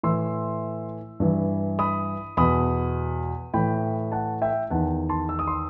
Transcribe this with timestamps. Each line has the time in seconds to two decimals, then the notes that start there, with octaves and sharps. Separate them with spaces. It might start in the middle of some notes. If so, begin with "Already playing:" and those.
0.03 A2 E3 C6 E6
1.20 G2 E3
1.79 B5 D#6
2.37 E2 B2 B5 D#6
3.54 A2 E3 G5 B5
4.12 F#5 A5
4.42 E5 G5
4.70 E2 D#3 F#5 A5
5.09 A5 C6
5.29 E6
5.39 D#6
5.47 C6